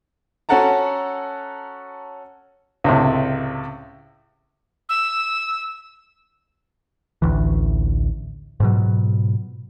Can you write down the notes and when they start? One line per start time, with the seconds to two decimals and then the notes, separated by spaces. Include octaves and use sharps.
0.49 C#4 F#4 A4 F#5 A5 A#5
2.84 C#2 A2 C3
4.89 E6
7.22 A1 D2 E3
8.60 G#2 B2 F#3